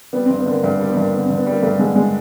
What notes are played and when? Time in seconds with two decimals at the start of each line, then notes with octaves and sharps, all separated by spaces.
0.13 G3 B3
0.25 C4
0.30 G2
0.39 B3
0.46 D3 A#3
0.64 G2 A3
0.76 G3 A#3
0.88 B3
0.97 G2 A#3
1.13 D3 B3
1.25 C4
1.30 G2
1.37 B3
1.46 G3 A#3
1.62 G2 A3
1.79 D3 G#3
1.96 G#3